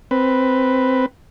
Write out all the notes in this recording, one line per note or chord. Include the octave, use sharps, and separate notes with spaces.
C4 B4